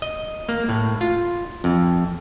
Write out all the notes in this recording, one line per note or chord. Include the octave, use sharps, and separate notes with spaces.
D#5
A#3
A2
F4
F2